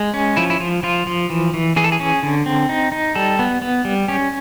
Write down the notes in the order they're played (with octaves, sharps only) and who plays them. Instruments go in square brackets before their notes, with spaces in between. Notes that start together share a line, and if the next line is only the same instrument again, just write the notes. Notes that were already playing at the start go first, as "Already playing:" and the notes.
Already playing: [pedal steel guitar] G#3
C#4
F3 E4
E4
F3 F4
F3 F4
F3
E3
E3
E3 G#4
A4
G#4
C#4
D3
C4
D#4
D#4
G3 A4
B3
B3
G3
C#4 G4